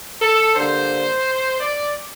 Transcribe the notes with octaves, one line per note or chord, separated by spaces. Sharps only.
A4
D3 G3 A#3 C5
D5